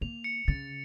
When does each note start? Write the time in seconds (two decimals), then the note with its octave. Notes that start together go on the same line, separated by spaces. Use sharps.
0.01 A#3 F7
0.24 C#7
0.48 C#3 A6